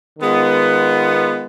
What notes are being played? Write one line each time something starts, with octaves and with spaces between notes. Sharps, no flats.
D#3 G#3 B3 F4